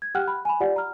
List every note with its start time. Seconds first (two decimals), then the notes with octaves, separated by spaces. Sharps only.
0.02 G#6
0.15 G4 F#5 G5 F6 F#6
0.28 B5
0.45 G#5 B5
0.60 F4 G4 D5 F#5
0.76 A#5 F6